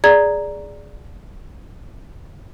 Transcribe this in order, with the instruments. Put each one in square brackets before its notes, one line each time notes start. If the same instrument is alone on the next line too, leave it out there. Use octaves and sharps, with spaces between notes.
[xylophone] G#4 D5 A#5 G#6